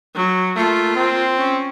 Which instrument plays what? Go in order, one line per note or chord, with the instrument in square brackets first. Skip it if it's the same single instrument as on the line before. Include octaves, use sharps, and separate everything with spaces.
[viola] F#3
[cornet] A3 [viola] A#3 F4
[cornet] C4
[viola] C#4